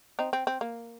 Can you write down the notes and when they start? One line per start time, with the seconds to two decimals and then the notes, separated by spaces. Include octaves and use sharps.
0.19 C4 D#4
0.33 C4
0.47 C4
0.61 A#3